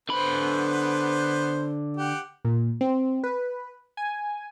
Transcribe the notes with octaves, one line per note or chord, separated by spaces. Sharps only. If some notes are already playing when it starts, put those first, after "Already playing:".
D3 B3 B4 C5 B5
G4 F#5
A#2
C4
B4
G#5